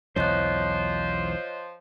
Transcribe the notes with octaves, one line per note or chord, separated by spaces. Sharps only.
B1 E2 E3 F3 C5 C#5 D#5 F#6